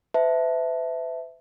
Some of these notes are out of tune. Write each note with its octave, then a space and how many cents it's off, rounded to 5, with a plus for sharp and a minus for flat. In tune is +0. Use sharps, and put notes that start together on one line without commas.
B4 +45 E5 +0 A5 +0